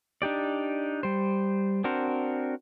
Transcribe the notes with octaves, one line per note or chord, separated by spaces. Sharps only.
D4 D#4 G4 D5
G3 C5
C4 D4 F#4 A#4 C5